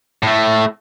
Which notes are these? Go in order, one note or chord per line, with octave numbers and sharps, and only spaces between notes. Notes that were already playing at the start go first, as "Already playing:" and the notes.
A2 A3